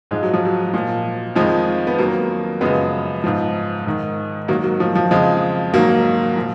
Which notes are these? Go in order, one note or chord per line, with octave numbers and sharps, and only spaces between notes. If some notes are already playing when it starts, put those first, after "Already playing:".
G#2 F3 G#3
F#3
F3
F#3
A#2 F3
F2 D#3 F3 G#3
B3
F2 D#3 F#3 A#3
F#2 C#3 F3 G#3 B3
G#2 F3
G#2 D#3
G#2 D#3 F#3 A#3
F#3
F3
F3
F2 C#3 F3 G#3
G#2 D#3 F#3 A#3
A#2 F3